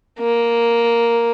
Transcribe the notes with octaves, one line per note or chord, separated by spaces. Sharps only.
A#3